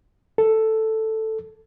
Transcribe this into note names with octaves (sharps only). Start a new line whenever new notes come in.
A4